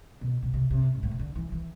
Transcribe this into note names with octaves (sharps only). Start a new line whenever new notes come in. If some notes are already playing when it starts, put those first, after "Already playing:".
B2
B2
C3
C3
G#2
A2
C3
D3
E3
E3